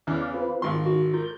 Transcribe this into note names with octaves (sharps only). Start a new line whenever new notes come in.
E2 C#3 E3 D5 F5
C4 F4 B4
G#1 D#3 F4 C6
F#4
F4 A#4 G6